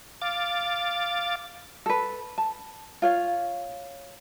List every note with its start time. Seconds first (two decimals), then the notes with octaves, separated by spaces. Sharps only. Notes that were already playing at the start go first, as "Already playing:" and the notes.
0.21 F5 D6 A6
1.86 A4 B4
2.38 A5
3.02 F4 C#5 F5